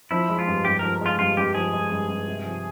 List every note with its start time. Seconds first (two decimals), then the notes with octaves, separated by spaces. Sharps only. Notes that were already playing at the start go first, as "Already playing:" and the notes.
0.11 F3 E4
0.30 G#3
0.39 F4
0.47 G2
0.65 G2 G4
0.79 F3 A#4
1.01 G#3 F4
1.19 G2 F4
1.37 G2 G4
1.54 F3 G#4
1.73 G#3
1.91 G2
2.09 G2
2.27 C3
2.45 F3